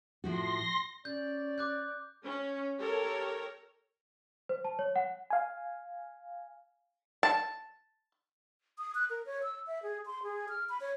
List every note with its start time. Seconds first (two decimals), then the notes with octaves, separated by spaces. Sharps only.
0.24 A2 F3 F#4 C6 A#6
1.05 C#4 D5 G6
1.58 D6 F#6 G6
2.23 C#4
2.78 G4 A4 A#4 C#5
4.49 C5
4.65 A5
4.79 C#5
4.96 F#5
5.30 F5 G#5
7.23 A5
8.78 D#6
8.95 F#6
9.10 A#4
9.26 C#5
9.43 E6
9.67 E5
9.83 G#4
10.06 C6
10.23 G#4
10.49 F6
10.69 B5
10.81 C#5